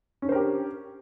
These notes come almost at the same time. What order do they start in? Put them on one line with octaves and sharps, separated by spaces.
C#4 D4 C5 A#4 G4